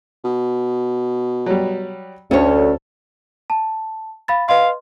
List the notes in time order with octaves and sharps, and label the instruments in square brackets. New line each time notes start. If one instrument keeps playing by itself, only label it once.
[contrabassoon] B2
[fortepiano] F#3 G3
[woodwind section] D2 [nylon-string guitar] C#4 C#5 [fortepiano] A4
[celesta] A5
F5 B5 A6
[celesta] B4 D#5 C6 [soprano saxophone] F5